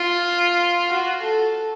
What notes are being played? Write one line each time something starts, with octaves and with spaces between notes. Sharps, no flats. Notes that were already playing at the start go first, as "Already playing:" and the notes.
Already playing: F4
F#4
A4